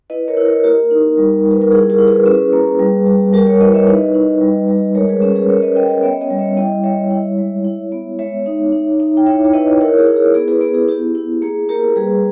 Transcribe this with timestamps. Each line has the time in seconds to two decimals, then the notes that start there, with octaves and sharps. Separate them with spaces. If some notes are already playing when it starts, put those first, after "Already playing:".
0.10 E4 B4 D#5
0.28 A#4 C#5
0.37 E4
0.46 A#4 C#5
0.64 A#3 G4 A#4
0.91 D#4
1.17 G3
1.45 G3
1.51 B4
1.62 A#4
1.72 E4 G#4
1.90 G4 A#4
1.98 E4
2.08 G#4 B4
2.25 C#4 G#4 B4
2.53 A#3
2.80 G3
3.06 G3
3.33 G3 G4 A#4
3.47 A#4 C#5
3.61 E4 B4 D#5
3.74 C#5 E5
3.87 D#4 B4 D#5
4.14 D#4
4.41 G3
4.68 G3
4.95 G#3 A#4 C#5
5.09 G#4 B4
5.22 C#4 G#4
5.36 G#4 B4
5.49 C#4 A#4 C#5
5.62 B4 D#5
5.76 C#4 D#5 G5
5.89 D#5 G5
6.03 B3 C#5 E5
6.21 D#5 G5
6.30 G3
6.38 C#5 E5
6.57 E4 D#5 G5
6.84 G3 C#5 E5
7.11 E4
7.38 G#3
7.64 E4
7.92 B3
8.19 G#3 C#5 E5
8.46 D#4
8.72 D#4
9.00 D#4
9.17 G5
9.26 E4 C#5 E5
9.45 C#5
9.53 E4 B4 D#5
9.81 E4 A#4 C#5
9.98 G#4
10.07 E4
10.16 G#4
10.34 B3 G#4
10.48 G#4 B4
10.61 B3 G#4
10.74 G#4
10.88 E4 G4
11.15 E4
11.42 A#3 G#4
11.69 A#3 G4 A#4
11.96 G3 G#4 B4